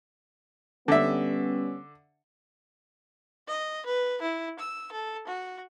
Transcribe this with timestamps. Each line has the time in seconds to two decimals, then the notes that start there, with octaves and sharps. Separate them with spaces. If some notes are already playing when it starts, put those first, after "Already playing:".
0.88 D3 G3 B3 C#4 E5
3.48 D#5
3.86 B4
4.22 E4
4.60 E6
4.92 A4
5.27 F#4